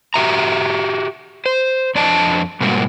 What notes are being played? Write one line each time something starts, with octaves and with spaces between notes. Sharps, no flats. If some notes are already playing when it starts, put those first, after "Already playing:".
F#4 G4 E5 A#5
C5
F2 D4 D5 D#5 A5
G#2 B2 G3 A#3 F#4